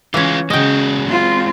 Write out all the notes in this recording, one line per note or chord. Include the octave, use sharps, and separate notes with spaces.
E3 G#3 C#4 F4
C#3 G#3 F#4 D#5 G5
C4 F4